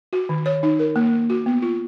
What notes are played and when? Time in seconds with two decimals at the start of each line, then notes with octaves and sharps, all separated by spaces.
0.13 F#4
0.29 D#3
0.46 C#5
0.63 D#4
0.79 A#4
0.96 A#3
1.13 A#3
1.30 F#4
1.46 B3
1.62 F4